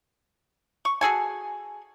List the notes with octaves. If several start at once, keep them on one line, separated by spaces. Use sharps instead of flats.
C#6
F#4 G#4 A4 G#5